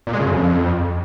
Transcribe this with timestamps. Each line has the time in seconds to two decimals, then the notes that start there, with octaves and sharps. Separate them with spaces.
0.07 A#2
0.13 G#3
0.19 C#3
0.26 F#2
0.32 F2